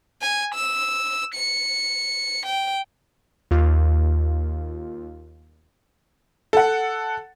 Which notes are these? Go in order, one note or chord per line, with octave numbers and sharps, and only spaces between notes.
G#5
E6
C#7
G5
D#2 F4
A4 F#5